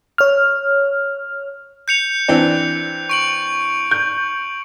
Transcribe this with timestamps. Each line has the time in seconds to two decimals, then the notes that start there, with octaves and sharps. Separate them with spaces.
0.18 C#5 F6
1.88 G6 C#7 F7
2.28 E3 C4 D4
3.09 C#6 D7 F#7
3.91 G6